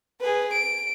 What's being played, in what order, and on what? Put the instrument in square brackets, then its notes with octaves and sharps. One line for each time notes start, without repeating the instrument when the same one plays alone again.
[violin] G#4 B4
D7